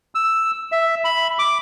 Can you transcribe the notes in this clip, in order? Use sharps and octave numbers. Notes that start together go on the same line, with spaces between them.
E6
E5
B5
D6